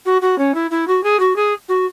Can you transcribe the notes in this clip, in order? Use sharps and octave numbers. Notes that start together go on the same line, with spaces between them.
F#4
F#4
C#4
E4
E4
F#4
G#4
F#4
G#4
F#4